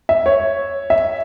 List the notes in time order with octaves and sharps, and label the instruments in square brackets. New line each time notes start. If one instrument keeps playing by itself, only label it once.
[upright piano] E5
C#5
E5